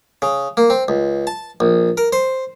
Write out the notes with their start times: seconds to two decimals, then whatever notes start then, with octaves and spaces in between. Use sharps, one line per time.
0.22 C#3
0.57 A#3
0.70 C4
0.88 C#2
1.27 A5
1.60 A#1
1.97 A#4
2.13 C5